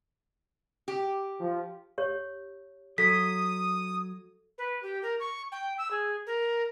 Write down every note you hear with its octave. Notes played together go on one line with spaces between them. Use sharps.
G4
F3
G4 C#5
F#3 A4 D#6 B6
B4
G4
A#4
C#6
G5
E6
G#4
A#4